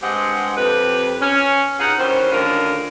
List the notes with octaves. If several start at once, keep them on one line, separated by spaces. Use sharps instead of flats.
G2 G#3 C4 G4 D#5 F#5
F2 G4 B4
C#4
G2 D#4 F4 G#4 F#5
D#3 E3 G3 C#4 C5
D2 D3 D#3 C#4 F4 A#4